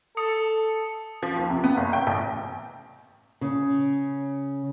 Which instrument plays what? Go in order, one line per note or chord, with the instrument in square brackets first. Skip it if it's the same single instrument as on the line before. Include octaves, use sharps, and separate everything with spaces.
[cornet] A4 [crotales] D#6 C#7
[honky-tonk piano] F3
D#2
C3
B3
F#1
G5
A1
[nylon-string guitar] C#3